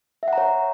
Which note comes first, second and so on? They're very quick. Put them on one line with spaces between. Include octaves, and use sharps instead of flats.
E5 F#5 A#5 C#5